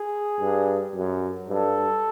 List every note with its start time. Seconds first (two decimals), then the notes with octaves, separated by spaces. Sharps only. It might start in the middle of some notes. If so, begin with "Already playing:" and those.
Already playing: G#4
0.40 G2
0.95 F#2
1.49 G2 A4